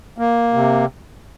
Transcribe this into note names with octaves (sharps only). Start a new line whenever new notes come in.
A#3
C3